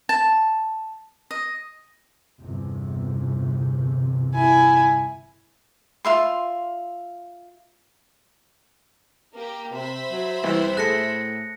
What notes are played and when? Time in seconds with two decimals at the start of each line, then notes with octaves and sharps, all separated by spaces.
0.09 A5
1.31 D#5
2.40 G1 E2 C3
4.34 E4 G#5
6.05 F4 E5 C6
9.35 A#3 G4
9.73 C3 C5 E5 B5
10.12 F#3
10.44 C2 E3
10.77 A2 G#4 A4 F#6 A#6 C#7